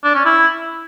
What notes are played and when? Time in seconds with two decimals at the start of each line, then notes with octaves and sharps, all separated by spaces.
0.04 D4
0.15 C#4
0.26 E4